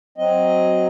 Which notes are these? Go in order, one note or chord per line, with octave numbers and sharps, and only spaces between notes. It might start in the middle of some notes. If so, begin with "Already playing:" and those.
F#3 C4 D#5